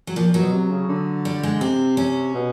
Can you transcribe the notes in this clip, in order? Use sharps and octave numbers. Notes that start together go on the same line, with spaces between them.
F#3
A#2 F3
A#2
F#3
B2
C3
C#3
D3
G3
G#3
C3 C4
C#4
B2